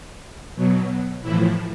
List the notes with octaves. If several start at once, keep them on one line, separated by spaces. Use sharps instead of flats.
B2 F#3
A2 E3 F3 E4